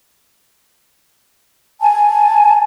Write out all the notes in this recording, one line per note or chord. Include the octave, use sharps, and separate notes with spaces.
G#5 A5